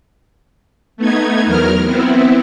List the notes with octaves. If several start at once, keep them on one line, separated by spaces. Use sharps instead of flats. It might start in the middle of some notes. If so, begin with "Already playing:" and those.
A3 B3 D#4 G#6
E2 F#3 A#4 F6
B3 C4 E4